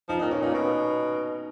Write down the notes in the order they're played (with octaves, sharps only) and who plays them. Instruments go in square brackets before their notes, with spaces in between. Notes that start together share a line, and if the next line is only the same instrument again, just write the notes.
[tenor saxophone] F3 [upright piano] D#4
[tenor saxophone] A#2 [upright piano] D#4
[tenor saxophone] B2 [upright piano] C#4
[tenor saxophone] A#2 [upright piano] D#4
[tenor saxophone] B2